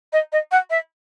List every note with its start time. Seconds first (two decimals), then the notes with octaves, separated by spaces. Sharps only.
0.12 D#5
0.32 D#5
0.51 F#5
0.70 E5